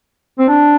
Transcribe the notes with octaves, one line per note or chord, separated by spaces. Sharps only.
C4
D4